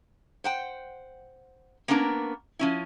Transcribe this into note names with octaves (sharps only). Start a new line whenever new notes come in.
C5 F#5 G5
A#3 B3 C#4 D4 A#4
F3 C#4 E4